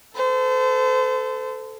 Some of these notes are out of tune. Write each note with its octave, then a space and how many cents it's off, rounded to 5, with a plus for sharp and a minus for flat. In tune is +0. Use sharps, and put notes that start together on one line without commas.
A4 +0 C5 -35